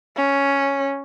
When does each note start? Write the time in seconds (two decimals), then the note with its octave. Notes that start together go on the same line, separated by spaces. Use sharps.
0.17 C#4